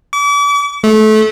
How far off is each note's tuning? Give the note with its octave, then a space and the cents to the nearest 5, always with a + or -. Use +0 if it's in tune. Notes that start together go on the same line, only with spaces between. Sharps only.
D6 -40
A3 -25